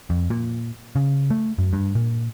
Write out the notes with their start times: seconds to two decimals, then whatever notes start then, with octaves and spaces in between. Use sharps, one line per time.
0.10 F2
0.30 A#2
0.96 C#3
1.30 A3
1.58 F#2
1.73 G2
1.95 A#2